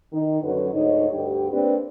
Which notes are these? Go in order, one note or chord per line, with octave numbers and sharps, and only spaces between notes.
D#3 D#4
F#2 D3 F#3 B4
D2 G#2 D#4 C#5 D#5
D2 G2 G4
A#3 C4 D4 G4 B4